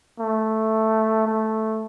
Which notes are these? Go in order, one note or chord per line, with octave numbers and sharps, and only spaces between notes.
A3
A3